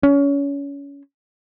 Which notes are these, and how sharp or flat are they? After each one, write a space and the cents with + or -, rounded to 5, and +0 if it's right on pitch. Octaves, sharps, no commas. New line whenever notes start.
C#4 +25